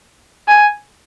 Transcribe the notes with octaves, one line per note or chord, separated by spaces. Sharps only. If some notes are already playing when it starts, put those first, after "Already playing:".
G#5